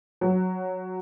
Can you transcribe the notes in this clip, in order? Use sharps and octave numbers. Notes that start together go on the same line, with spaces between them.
F#3